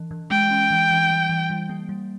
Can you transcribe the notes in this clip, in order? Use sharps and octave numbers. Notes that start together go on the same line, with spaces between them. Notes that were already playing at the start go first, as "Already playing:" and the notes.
Already playing: E3
E3
G#3 G5
C#4
E3
E3
G3
E3
G3
A#3
G3